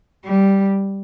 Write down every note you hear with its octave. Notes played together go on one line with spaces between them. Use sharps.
G3